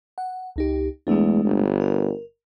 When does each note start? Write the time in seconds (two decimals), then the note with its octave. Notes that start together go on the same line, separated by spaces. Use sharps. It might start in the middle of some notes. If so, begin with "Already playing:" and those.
0.18 F#5
0.56 C#2 D#4 G4
1.07 E2 G#3 A3 D4
1.44 G1
1.81 A#4